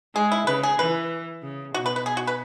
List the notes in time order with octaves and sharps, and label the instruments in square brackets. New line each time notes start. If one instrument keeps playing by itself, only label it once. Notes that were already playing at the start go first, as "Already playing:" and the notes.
[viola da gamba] G#3 [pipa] G#4
[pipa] E4
[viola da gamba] C#3 [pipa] B4
[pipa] G#4
[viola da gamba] E3 [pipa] B4
[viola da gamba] C#3
[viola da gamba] B2 [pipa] F#4
[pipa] B4
B4
G#4
F#4
B4